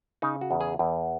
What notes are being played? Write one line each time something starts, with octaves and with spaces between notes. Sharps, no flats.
C#3 D#4
F#4
E2
G#4
E2